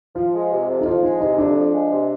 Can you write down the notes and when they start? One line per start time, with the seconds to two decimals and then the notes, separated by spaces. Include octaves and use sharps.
0.15 F3 F4
0.33 G#3
0.51 C3
0.68 F2
0.81 D#4
0.86 F3 F4
1.03 G#3 D#4
1.21 C3 D#4
1.38 F2 D4
1.56 F3
1.73 G#3
1.91 C3